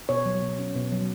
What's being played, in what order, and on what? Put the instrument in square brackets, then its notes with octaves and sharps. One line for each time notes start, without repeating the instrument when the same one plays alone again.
[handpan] B2 C#5
F#3
B2
C#4
B2
F#3